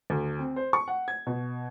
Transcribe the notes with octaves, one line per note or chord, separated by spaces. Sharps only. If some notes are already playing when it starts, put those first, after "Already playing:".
D2
C4
C5
C#6
F#5
G#6
B2